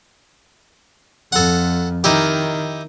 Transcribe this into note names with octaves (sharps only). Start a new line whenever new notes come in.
F2 A4 F#5
D#3 D#4 E4 G4